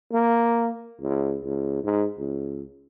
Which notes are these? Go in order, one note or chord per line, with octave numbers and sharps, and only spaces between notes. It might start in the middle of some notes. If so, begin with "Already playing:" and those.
A#3
C#2
C#2
G#2
C#2